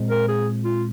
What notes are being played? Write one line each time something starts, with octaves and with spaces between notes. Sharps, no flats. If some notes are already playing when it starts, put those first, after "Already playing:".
Already playing: A#2 G#3 C4
A#4
G#4
F4